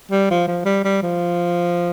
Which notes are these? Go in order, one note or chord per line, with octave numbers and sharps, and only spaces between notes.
G3
F3
F3
G3
G3
F3